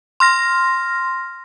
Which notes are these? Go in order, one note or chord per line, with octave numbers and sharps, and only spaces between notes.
C6 F6 A#6